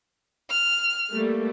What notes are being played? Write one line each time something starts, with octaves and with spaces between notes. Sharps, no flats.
F6
G3 A3 A#3